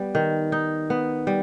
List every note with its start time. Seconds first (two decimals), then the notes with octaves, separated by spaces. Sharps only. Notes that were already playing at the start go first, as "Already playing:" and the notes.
Already playing: G3 B3
0.15 D#3
0.52 D#4
0.90 B3
1.27 G3